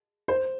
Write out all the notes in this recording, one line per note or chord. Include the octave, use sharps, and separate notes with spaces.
C5